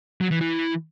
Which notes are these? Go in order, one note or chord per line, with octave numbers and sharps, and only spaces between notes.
F#3
E3
E3